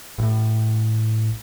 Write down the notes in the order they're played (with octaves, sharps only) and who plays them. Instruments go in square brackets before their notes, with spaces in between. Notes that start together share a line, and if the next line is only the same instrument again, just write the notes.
[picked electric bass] A1 A2